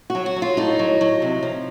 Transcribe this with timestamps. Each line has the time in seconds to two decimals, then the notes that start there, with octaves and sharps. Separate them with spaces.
0.10 F#4
0.15 F#3
0.26 F#4
0.36 F#3
0.42 F4
0.57 A2 D#4
0.79 F#3
1.01 F#3
1.22 C3
1.43 F3